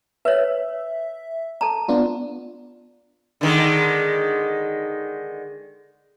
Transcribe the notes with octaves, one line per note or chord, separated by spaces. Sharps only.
B4 C#5 E5
A4 A5 A#5
B3 D4 F4
D3 D#3 G#3